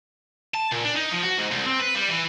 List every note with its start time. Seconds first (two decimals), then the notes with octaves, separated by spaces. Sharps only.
0.54 A5
0.72 A#2
0.84 D4
0.96 D#4
1.12 F3
1.23 F#4
1.38 G#2
1.51 C2
1.66 C4
1.80 B4
1.95 G3
2.09 E3